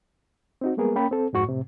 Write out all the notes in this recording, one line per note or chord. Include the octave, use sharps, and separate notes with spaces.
C4 D#4 F#4
G3 G#3 A#3 B3 G#4 A#4
A#3 C#4 G5 B5
C4 A4
F2 G#2 F#4 C#6
A2 C3